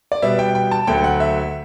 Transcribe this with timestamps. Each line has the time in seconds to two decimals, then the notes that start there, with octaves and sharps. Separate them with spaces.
0.12 D5
0.22 B2 G3 B3 E5
0.39 G5
0.55 G5
0.71 A5
0.87 D2 D3 F#3 A3 G5
1.04 F#5
1.20 E5